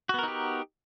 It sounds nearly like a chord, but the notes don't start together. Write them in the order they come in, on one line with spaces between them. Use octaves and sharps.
F#4 B3 A#4 D#4 G4